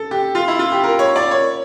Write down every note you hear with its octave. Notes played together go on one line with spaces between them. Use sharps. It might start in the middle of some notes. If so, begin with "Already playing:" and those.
Already playing: A4
G4
F4
E4
F4
G4
A#4
C#5
D5
C#5